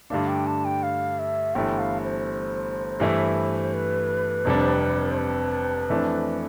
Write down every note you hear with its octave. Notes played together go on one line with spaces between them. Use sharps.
G2 D3 A3 D4 F5
G5
A5
G5
F5
E5
G1 G2 E3 A3 G5
F5
C5
G2 E3 A3 E4
B4
F1 F2 C3 G3 D4
C5
B4
F2 E3 A3 D4